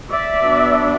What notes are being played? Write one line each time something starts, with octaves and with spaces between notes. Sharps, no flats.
D5 E5
F#3 B3 D4